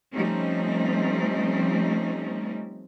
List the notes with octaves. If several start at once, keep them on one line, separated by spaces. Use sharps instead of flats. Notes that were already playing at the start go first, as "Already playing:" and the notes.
F3 G3 A3 C4 C#4 D#4